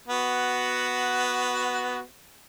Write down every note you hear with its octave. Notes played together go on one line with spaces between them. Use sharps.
B3 F#4